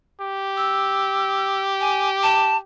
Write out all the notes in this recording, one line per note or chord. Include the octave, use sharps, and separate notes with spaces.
G4
E6
G#5
A5